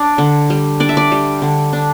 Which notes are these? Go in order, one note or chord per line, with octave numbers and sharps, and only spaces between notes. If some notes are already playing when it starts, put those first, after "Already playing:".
Already playing: D4 D5
D3
G3
D4 D5
E5
D5
G3
D3
D4